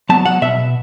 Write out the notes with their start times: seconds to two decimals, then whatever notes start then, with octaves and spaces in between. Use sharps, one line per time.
0.09 F#3 B3 A5
0.25 F#5
0.42 B2 E5